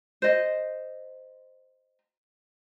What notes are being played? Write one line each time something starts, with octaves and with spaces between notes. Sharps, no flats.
C5 D#5